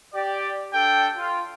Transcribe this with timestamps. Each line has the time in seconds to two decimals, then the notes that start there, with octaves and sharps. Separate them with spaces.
0.14 G4 D5
0.73 D4 A4 G5
1.16 F4